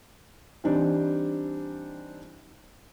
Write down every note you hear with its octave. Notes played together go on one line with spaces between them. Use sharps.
E3 G3 C4 D4 D#4